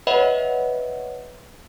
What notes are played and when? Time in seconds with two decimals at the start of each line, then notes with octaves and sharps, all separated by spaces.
0.07 B4 C#5 D#5 E5 F#5 B5